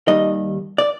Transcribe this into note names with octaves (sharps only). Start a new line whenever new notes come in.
D#2 D#3 G3 D#5
D5